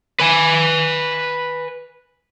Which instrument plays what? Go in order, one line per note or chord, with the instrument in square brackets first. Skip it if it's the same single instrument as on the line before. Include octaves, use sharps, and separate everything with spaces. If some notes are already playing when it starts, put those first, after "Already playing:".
[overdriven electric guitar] B4 G#5